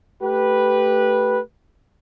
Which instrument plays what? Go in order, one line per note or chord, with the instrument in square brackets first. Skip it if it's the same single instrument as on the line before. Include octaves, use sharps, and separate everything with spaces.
[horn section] A3 G4 B4